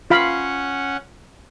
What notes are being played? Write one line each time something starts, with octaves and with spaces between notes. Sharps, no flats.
C#4 F4 F5 F#5 B5